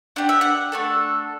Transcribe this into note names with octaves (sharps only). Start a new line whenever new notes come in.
D4 G4 F#5
E5
F#5
A3 D4 A4